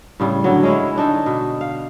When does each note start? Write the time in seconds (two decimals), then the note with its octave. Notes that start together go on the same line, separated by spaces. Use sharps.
0.20 A2 C#3 G3
0.44 D3 F#3
0.63 G#3 C#4 E4
0.96 D3 D4 D#4
1.26 B2
1.61 F5